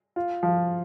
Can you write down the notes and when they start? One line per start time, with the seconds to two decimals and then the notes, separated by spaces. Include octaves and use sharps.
0.16 F4
0.43 F3